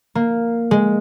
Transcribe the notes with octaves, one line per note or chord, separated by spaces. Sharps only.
A#3
G#3